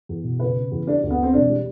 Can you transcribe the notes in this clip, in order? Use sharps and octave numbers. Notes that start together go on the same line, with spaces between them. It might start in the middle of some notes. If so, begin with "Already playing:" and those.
E2
B2
F#1 B4
F#1
E2
G3 D4
D2
B3
D3 C4
E1 D4
G3